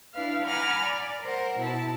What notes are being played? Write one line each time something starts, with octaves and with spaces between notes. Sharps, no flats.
D4 E4 B4 F5
F#5 G#5 A#5 B5 D6 F6
D5
A#4 C5 F#5
B2 E4 A5